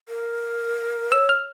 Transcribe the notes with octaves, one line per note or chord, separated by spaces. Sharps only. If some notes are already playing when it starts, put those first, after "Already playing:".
A#4
C#5 E6
F6